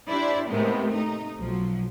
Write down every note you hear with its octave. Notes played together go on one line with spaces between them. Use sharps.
D4 E4 G4 C5 D5
D#2 A2 C3 G#3 B3
A3 D#4
B1 F3 F#3